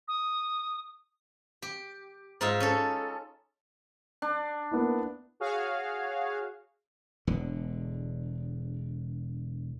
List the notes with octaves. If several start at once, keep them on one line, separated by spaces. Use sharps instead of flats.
D#6
G4
G#2 D#4 F4 E5
C#4 A4
D4
A#3 B3 E4
F#4 G#4 C#5 F5
E1 E2 D3